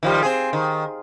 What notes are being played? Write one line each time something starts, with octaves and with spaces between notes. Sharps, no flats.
D#3 F3 G3
C4 G#4
D#3